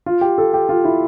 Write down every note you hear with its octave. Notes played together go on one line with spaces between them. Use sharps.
F4
G4
A4
G4
F4
E4